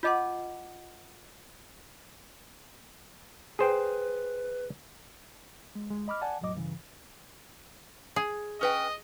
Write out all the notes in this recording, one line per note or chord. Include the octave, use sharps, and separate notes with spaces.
F4 D#5 F#5 A5 D6 G6
G#4 B4 C5 G5
G#3
D2 G#3
D#5 B5 D6 F6
D5 F#5 G#5 A5
C2 F2 A2 F#3 D#5 D6
G2 C#3 E3
G#4
C#4 B4 D#5 G5